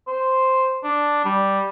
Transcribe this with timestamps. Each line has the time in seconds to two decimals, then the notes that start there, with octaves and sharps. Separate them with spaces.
0.07 C5
0.83 D4
1.25 G3